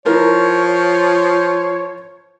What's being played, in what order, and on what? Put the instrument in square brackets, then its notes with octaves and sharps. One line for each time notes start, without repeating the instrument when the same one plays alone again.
[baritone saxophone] F3 [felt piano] E4 A#4 [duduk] C#5